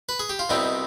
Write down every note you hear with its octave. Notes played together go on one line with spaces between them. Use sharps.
B4
G#4
G4
F4
C2 B2 G3 C4 D#4